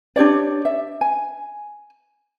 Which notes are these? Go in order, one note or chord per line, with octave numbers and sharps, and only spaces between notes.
D4 G4 C#5 D5
E5
G#5